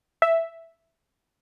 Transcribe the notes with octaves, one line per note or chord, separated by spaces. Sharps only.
E5